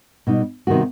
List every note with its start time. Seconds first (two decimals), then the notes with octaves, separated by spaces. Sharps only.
0.27 B2 G3 D#4
0.67 C3 D#3 G3 B3 F#4